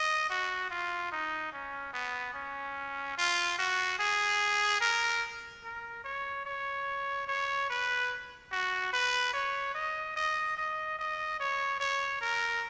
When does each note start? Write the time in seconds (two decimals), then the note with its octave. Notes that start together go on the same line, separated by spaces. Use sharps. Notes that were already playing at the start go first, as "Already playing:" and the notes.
Already playing: D#5
0.29 F#4
0.70 F4
1.12 D#4
1.52 C#4
1.93 B3
2.34 C#4
3.17 F4
3.58 F#4
3.99 G#4
4.81 A#4
5.64 A#4
6.04 C#5
6.45 C#5
7.27 C#5
7.70 B4
8.51 F#4
8.93 B4
9.33 C#5
9.74 D#5
10.16 D#5
10.57 D#5
10.98 D#5
11.40 C#5
11.80 C#5
12.21 A#4